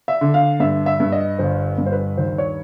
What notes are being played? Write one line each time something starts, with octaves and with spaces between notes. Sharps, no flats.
E5
D3
F5
G2 E5
E5
G2
D#5
G1 C5
G2
C5
B4
D#2 C5
C#5